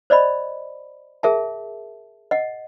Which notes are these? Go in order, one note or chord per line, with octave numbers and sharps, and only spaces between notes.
C5 D5 D#5 B5
G#4 A#4 E5 A5
D#5 F#5